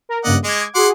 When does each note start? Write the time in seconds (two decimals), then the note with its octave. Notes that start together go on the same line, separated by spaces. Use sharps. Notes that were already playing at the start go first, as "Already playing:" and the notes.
0.09 A#4
0.24 G2 C#3 A#3 D5 D#5 F#5
0.44 G#3 D#5 D6 G#6
0.75 F#4 G#4 F#5 C6 D6